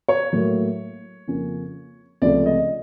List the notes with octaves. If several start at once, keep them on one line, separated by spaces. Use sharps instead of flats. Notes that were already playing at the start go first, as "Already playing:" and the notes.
C#5
A2 F#3 A#3
F2 C#3 F3 A#3 C#4
C#2 C3 F3 A3 D5
D#5